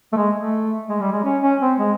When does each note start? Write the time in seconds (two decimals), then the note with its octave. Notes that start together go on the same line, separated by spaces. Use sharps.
0.13 A3
0.17 G#3
0.35 A3
0.89 G#3
1.00 G3
1.12 G#3
1.24 C#4
1.42 C#4
1.61 C4
1.79 G#3